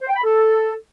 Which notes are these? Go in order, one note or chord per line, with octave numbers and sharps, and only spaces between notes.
C5
G5
B5
A4